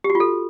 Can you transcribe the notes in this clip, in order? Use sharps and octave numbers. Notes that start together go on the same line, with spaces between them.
G4
F#4
F4
A4